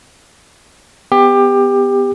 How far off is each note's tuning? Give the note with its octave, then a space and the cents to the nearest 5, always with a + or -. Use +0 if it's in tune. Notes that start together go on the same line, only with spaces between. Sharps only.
B3 +15 G4 +20